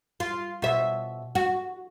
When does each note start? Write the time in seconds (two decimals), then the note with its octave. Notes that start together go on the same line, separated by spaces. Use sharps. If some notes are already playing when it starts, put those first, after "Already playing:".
0.20 F4
0.62 B2 E5
1.35 F#4